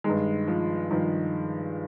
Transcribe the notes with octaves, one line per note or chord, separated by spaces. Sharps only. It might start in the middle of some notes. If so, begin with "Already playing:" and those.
G2 D#3 G#3
F3
G2 D#3 F3